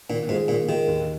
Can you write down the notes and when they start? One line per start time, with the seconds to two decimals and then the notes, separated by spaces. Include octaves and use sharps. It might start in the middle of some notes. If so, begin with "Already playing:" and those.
0.10 A#2 D#3
0.29 G#2 G#3 F4 G#4
0.48 A#2 D#3
0.68 D#3 G#3 F4 G#4
0.88 D#2